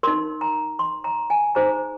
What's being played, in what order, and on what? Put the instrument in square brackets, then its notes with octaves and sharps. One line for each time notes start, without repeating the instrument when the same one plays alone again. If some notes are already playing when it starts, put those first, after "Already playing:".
[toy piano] D#4 A#4 C6
A#5
C6
A#5
G#5
D#4 G#4 C5 A#5